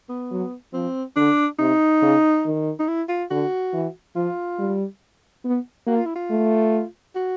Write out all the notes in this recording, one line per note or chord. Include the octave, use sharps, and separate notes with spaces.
B3
F#3
F3 C4
D3 D4
C3 D#4
C#3
D#3
D#4
E4
F4
D3 F#4
E3
F3 F4
G3
B3
A#3 F#4
F4
E4
F4
A3
F#4